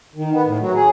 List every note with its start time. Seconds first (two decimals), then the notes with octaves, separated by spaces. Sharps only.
0.15 D#3
0.32 B3
0.45 A2
0.60 F#3
0.75 G#4